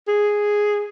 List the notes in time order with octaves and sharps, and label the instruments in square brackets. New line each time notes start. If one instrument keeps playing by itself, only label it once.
[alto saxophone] G#4